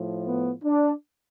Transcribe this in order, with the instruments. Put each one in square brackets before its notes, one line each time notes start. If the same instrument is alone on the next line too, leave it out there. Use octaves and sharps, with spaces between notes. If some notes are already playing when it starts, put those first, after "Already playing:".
Already playing: [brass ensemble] A2 F3
B3
D4